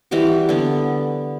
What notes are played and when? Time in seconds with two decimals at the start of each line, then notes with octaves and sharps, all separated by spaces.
0.11 E3 G3 F#4 G4
0.49 D3 B3